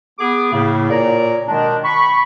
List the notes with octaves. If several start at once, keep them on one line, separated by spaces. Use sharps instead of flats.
B3 G#4 D6
A2 C#3 A#3
A#2 A#3 A#4 C#5 D5 A#5
B2 D#3 G#3 D4
B5 C#6